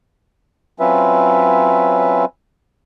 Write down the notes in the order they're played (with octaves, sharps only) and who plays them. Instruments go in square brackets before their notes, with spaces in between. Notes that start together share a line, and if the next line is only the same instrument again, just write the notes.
[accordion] F#3 C4 C#4 F4 B4 E5